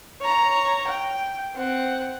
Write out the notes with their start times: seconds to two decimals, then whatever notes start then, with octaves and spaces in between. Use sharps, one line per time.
0.21 C#5 A#5
0.87 G5
1.55 C4 F#5